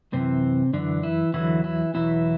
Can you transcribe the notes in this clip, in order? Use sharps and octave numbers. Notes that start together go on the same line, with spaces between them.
F#2 C3 E3 C4
F#2 D3 E3 D4
E3 E4
E2 D3 E3 F#3 E4
E3 E4
E2 B2 E3 F#3 E4